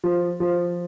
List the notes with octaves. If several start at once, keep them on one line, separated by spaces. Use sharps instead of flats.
F3
F3